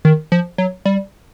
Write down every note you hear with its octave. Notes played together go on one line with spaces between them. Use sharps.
D#3
F3
F#3
G3